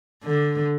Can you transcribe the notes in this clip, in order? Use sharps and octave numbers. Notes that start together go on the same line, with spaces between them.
D3